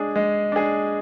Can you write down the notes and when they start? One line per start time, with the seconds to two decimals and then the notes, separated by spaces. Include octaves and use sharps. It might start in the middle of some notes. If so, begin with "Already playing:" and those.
Already playing: G#3 D4 G#4
0.16 G#3
0.52 D4 G#4